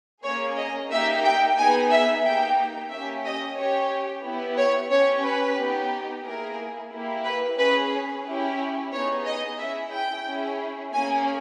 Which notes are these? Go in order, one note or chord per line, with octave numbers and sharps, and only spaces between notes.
A#3 C#4 G#4 C#5
D#5
A#3 D#4 G4 E5
G5
B3 D#4 G#4 G#5
E5
A#3 D#4 G4 G5
A#3 C#4 G4 E5
D#5
C#4 G4 C#5
B3 E4 G4
C#5
C#4 G4 C#5
B4
B3 D#4 G4
A#3 E4 G#4 A#4
A#3 E4 G4
B4
C#4 G#4 B4
C#4 E4 G4
B3 D#4 G#4 C#5
D#5
C#4 E4 G#4 E5
G5
C#4 E4 G#4
A#3 C#4 G#4 G#5